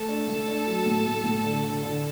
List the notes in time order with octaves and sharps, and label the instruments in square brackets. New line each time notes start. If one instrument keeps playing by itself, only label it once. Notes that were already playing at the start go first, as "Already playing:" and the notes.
Already playing: [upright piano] A3 [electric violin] A4
[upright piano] D4
A3
D4
F#3
A2
A2
A2
D3
D3
D3